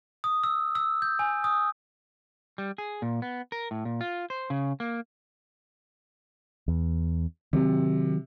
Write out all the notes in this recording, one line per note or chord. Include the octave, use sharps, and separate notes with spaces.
D#6
E6
E6
G6
G#5
D#6
G3
G#4
A#2
B3
A#4
A2
A#2
F4
C5
C#3
A#3
E2
C3 D#3 F#3